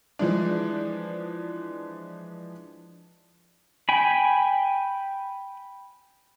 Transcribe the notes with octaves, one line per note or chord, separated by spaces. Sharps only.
E3 F3 G#3 D4
G5 G#5 B5